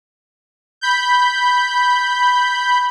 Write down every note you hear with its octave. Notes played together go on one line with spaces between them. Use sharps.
B5 G6